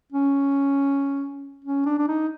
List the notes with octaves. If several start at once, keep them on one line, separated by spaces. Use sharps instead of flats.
C#4
C#4
D4
D4
D#4